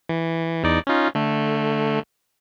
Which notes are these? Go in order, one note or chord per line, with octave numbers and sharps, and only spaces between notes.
E3
E2 D#4 D5
C#4 D#4 F4
D3 A3